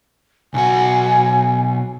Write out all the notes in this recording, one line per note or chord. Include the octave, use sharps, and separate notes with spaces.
B1 F#4 G#5